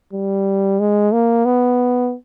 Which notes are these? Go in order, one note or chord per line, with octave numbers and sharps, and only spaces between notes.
G3
G#3
A#3
B3